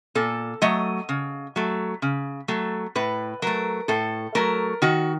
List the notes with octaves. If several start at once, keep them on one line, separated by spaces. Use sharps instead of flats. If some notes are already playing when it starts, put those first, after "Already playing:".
A#2 A4
F#3 A3 D#5
C#3
F#3 A3
C#3
F#3 A3
A2 B4
F#3 A3 A#4
A2 A4
F#3 A3 A#4
D#3 F#4